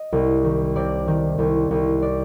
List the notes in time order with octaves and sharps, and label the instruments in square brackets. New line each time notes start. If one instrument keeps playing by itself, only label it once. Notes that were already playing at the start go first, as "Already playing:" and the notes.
Already playing: [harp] D#5
C2
D#3
C3 D5
D#3
C2
C2
D5